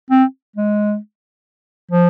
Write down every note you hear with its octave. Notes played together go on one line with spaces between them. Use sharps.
C4
G#3
F3